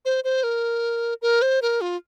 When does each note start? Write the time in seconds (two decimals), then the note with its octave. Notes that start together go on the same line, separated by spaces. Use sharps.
0.05 C5
0.24 C5
0.43 A#4
1.22 A#4
1.42 C5
1.62 A#4
1.81 F4